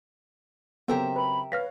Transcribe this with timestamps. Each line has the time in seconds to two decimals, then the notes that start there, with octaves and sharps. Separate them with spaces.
0.88 C#3 F#3 B3 C4 G4 A4 A#4 E5
1.16 B4 B5
1.52 B4 C#5 F5 F6 A#6 B6